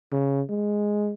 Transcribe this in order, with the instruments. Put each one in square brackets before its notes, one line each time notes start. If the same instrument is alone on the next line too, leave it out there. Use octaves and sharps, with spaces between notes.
[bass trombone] C#3
G#3